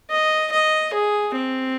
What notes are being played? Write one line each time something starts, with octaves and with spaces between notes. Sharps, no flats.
D#5
D#5
G#4
C4